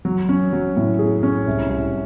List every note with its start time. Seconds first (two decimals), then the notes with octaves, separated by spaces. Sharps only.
0.05 F#3
0.29 C#4
0.53 F#3
0.77 A2
0.99 G#4
1.23 C#4
1.47 C2
1.70 C2